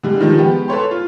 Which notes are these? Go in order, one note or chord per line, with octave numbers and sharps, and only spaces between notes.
D3 G3 G#3
D#3 F3 G3
G#3 B3 G4
A4 B4 C#5 C6
F4